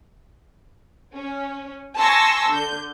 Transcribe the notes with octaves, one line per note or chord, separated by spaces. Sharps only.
C#4
G#5 A5 C6 C#6 E6 A#6
D3 G6